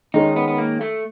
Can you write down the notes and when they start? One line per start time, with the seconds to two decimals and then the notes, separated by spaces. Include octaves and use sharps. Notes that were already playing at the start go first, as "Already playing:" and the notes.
0.14 D#3 G#3 C#4 D#4
0.36 B3
0.48 B3
0.58 A#3
0.81 A3